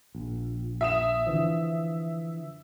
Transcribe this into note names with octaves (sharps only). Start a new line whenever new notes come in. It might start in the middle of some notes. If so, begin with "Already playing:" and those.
A#1
E5 D#6 E7
D3 E3 F3